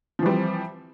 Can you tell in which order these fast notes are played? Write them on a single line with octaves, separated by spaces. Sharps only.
F3 E3 G3 C4